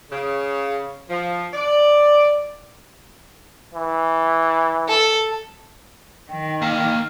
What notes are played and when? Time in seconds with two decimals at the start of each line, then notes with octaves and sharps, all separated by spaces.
0.11 C#3
1.08 F3
1.53 D5
3.74 E3
4.88 A4
6.30 D#3 G5
6.62 A#3 A5 F6